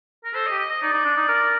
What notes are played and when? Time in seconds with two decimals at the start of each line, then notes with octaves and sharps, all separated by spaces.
0.25 A#4
0.34 A4 C5
0.47 D#5
0.51 G4
0.59 D#5
0.70 D#5
0.82 D#4 D5
0.93 D#4
1.05 D4
1.17 D#4
1.29 A#4